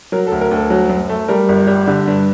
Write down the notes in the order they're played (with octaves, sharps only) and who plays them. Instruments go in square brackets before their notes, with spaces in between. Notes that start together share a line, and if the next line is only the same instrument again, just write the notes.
[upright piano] F#3 A#4
A4
D2
A#4
D2 A4
F#3
F#2
A3
G3 A#4
G1
G3
D3
G2